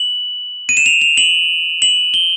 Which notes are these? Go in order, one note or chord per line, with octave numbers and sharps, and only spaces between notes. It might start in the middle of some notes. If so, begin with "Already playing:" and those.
Already playing: F#7
D#7
E7
F7
F7
F#7
F#7
G7